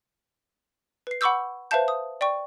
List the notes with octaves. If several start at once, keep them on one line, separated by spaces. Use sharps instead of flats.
B4 C7
F#5 B5 C#6 D6 E6 G6
B4 C5 E5 F5 A5 G6
D#6
D5 G5 C#6